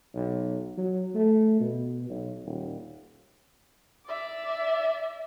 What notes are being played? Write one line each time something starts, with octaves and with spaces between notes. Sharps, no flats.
B1
F#3
A3
B2
B1
D#1
D5 E5